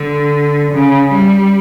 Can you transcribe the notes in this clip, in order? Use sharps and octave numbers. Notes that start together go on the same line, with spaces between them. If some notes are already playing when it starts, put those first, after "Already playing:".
Already playing: D3
C#3
G3